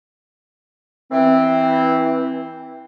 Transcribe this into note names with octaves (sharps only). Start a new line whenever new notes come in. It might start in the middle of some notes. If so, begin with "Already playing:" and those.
E3 C4